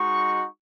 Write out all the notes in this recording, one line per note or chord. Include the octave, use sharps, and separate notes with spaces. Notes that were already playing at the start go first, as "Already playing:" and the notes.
Already playing: G#3 D#4 F#4 C#6